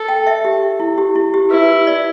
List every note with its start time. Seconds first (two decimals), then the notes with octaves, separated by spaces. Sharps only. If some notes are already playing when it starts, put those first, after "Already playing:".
Already playing: A4
0.08 G5
0.27 E5
0.45 G4
0.80 E4
0.98 G4
1.15 E4
1.34 G4
1.51 E4 B4
1.87 D5